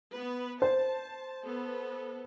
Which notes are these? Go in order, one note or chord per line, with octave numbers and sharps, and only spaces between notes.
B3 B4
C5 A5
B3 A4